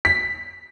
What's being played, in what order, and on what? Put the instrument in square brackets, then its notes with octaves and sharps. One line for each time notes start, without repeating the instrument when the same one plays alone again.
[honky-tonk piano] B6